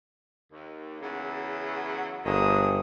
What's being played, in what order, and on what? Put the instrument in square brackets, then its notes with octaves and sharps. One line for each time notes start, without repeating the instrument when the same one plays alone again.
[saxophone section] D#2
E2 C#3 F#3
[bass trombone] G1 [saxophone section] D3 D#3 G#4 [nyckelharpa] D#6